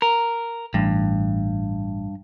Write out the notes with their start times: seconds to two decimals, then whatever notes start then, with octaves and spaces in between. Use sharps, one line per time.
0.02 A#4
0.74 A1 G2